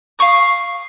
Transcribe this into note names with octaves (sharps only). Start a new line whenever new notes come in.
F5 G#5 C#6 D#6